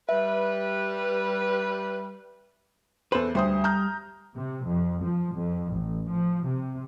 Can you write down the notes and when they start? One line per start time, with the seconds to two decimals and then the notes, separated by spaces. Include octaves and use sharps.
0.09 G3 B4 E5
3.12 E2 A4 B4 C5
3.35 D2 G3 C5 D#6
3.64 A#5 F6 G6
4.35 C3
4.66 F2
5.01 F3
5.35 F2
5.70 A1
6.09 F3
6.45 C3